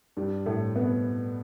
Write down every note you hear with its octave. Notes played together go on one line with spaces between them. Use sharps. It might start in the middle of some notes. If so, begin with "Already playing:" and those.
G2 G3
A2 A3
B2 B3